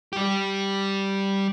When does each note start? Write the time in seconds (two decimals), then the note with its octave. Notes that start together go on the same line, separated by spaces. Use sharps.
0.13 G3 G4